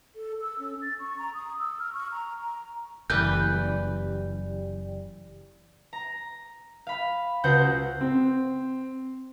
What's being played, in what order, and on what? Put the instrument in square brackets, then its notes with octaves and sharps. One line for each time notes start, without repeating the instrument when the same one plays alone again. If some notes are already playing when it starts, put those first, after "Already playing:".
[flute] A4
E6
C#4
A6
C#6
A#5
D#6
E6
F6
C#6
A#5
A#5
[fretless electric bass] F#1 [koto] E3 G3 B4 [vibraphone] G4 D5 G5 [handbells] G6
[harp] A#5
F5 B5
C#2 F#4 C5 F#5 G6
[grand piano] C4